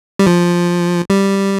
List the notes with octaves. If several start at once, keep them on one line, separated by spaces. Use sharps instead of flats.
G3
F3
G3